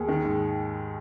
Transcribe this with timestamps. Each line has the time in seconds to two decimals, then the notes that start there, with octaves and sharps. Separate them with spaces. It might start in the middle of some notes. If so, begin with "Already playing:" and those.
Already playing: D#2 G#4
0.08 D#3
0.25 G#2